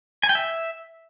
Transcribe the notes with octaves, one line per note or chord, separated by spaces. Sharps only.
G#5
G5
E5